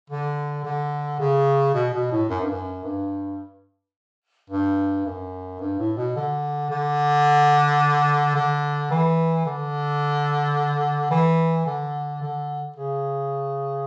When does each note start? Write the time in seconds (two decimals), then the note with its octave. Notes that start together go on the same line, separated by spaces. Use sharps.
0.10 D3
0.64 D3
1.19 C#3
1.74 B2
1.93 B2
2.12 A2
2.29 F#2
2.41 G2
2.51 F#2
2.84 G2
4.50 G2
5.06 F#2
5.60 G2
5.79 A2
5.97 B2
6.16 D3
6.70 D3
8.35 D3
8.91 E3
9.46 D3
11.11 E3
11.66 D3
12.22 D3
12.76 C#3